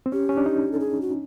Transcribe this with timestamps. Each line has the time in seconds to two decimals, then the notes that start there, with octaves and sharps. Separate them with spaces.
0.06 C4
0.12 C#4 G4
0.29 C#4
0.37 D4
0.46 D#4
0.72 A4
0.80 G#4
1.01 F#4